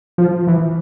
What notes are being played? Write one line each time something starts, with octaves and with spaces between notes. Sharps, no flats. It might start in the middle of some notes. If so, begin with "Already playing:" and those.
F3
E3